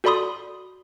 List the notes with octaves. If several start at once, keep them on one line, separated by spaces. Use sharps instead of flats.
F#4 A4 D5 B5 C6 D#6